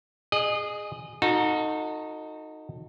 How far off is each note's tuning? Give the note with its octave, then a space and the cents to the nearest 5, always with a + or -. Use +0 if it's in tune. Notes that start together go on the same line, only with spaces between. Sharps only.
G#4 +0 D#5 -30
D#4 +0 F#4 -30 A4 +25